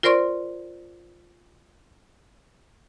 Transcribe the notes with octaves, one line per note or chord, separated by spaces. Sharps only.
F4 A#4 C5 D5 C6 C#6